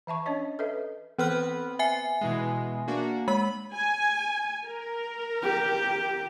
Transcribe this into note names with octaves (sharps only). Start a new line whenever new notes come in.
E3 E5 A5 C#6
C#4 D4 C#5 D#5
A4 B4 D#5 E5
E3 B3 C4 B4 F6
E5 G#5 C7
B2 E3 G#3
A#3 D4 F#4
G#3 B5
G#5
A#4
G4